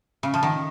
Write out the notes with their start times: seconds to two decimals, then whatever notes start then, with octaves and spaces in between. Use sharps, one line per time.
0.23 C#3
0.34 F3
0.43 D#3